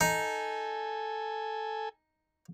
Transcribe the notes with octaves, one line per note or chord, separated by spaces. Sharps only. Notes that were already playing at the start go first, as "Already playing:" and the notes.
D#4 A4 G#5